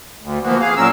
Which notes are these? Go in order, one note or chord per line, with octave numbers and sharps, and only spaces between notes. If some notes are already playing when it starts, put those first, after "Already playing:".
D2
E3 F3 A#3 B3 F#4
G#4 F5
A#2 F#3 C#4 A#4 E6